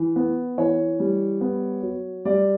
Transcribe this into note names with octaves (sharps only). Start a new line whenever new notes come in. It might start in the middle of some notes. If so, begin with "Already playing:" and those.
Already playing: E3
B3
E3 C#5
G3
B3
F#3
G3 D5